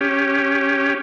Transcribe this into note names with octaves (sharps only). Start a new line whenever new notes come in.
C#4 G4